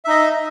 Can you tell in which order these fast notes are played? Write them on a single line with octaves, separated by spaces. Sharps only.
E5 D#4 D#5